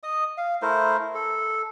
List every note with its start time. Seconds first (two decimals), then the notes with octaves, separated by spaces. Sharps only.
0.03 D#5 D#6
0.38 F5
0.62 A3 E4 A#4 C5
1.15 A4